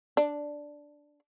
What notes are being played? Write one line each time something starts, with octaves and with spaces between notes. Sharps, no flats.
D4